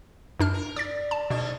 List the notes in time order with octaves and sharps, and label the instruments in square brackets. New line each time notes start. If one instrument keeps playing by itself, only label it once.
[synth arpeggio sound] F#2 D4 F6
[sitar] A#4
[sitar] D5 [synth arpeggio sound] D6 A6
[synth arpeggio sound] A5
[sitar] G#2 D4 [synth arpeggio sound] B2